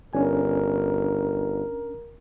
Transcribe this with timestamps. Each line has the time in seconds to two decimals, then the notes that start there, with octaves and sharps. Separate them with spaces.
0.13 G1 C#4 D4 A#4 G#5